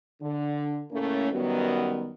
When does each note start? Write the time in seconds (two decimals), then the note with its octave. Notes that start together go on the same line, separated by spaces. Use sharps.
0.22 D3
0.91 A2 C#3 A3 A#3 C#4
1.32 F#2 D#3 F#3 G3 B3